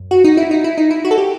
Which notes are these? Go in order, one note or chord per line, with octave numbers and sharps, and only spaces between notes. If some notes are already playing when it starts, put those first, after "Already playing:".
Already playing: F#2
F#4
D#4
E4
D#4
E4
D#4
E4
F#4
A4
G4